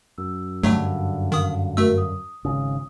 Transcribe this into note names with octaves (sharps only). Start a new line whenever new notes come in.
F#2 E6
G2 D3 F#3 A3
D#3 F5 D#6
A3 F#4 A#4 E5 E6
D#6
G#1 C#3 D#6